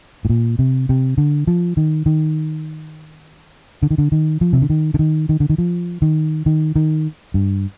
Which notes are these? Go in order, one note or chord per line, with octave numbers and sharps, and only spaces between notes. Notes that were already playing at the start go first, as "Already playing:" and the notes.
A2
A#2
C3
C3
D3
F3
D#3
D#3
D3
D#3
D3
D#3
F3
C3
D3
D#3
D3
D#3
D#3
D3
D#3
F3
D#3
D#3
D#3
G2